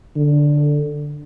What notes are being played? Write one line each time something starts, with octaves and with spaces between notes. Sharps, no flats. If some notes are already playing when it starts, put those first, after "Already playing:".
D3